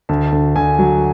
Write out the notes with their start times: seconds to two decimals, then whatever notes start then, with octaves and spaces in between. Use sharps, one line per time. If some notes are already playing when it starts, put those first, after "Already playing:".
0.09 D2 A5
0.32 D2
0.56 D2 G#5
0.79 F#3